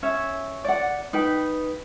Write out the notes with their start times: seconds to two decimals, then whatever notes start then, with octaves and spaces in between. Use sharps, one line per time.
0.03 C#4 C#5 E5
0.65 D5 F#5
1.13 D#4 B4 G5